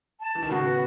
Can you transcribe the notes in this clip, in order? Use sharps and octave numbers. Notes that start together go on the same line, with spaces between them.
A5
E3
D#3
A2 C#3 F#4
B3